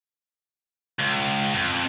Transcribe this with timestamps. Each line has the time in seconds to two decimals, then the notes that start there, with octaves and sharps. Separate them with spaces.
0.99 C#2
1.55 F2